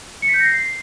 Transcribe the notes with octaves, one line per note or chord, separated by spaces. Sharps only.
C#7
B6
G6
A#6
C7